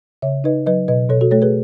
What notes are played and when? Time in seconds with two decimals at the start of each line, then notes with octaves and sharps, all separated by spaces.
0.22 C#3 C#5 E5
0.44 D#4 B4 D#5
0.66 F#3 B4 D#5
0.88 B2 B4 D#5
1.09 B2 A4 C#5
1.21 F#4 A4
1.31 A3 A4 C#5
1.42 G#4 B4